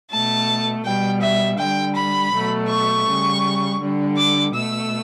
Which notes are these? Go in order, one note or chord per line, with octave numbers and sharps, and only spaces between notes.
B2 A3 A5
B2 G3 G5
E5
D3 G3 G5
B5
B2 F#3 A3
C#6
C#3 G3
D3 G3
D6
B2 A3 E6